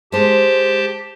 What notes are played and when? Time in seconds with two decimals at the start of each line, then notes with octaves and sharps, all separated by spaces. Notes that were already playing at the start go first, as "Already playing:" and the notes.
0.12 G#3 G4 C5 A5